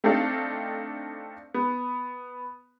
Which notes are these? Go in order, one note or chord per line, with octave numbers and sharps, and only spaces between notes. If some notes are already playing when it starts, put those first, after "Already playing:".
A3 C4 D4 D#4 A4 F5
B3